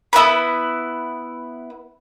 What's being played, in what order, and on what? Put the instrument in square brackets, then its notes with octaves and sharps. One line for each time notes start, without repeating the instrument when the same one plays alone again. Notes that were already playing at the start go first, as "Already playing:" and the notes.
[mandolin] B3 E4 B4 B5